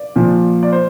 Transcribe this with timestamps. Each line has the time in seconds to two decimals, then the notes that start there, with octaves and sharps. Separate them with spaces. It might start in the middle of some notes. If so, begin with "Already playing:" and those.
Already playing: D5
0.16 A#2 F3
0.63 D5
0.72 C5